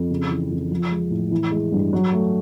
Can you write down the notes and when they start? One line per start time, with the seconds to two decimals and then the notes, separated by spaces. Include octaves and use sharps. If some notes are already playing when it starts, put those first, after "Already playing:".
Already playing: F2
0.10 C#3
0.30 E3
0.51 F2
0.71 F3
0.91 G#3
1.11 A2
1.31 E3
1.51 G#3
1.72 G2
1.93 F#3
2.12 A3